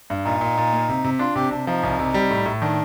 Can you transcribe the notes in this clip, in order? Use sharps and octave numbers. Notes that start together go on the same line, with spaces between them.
G2
A#2 D#4
A#2
A#2
A#3
C3
C3
D4 F4
C3 G4
C3 D4
F3 D#4
C2
C3
G3
A2
A2
D#3 D4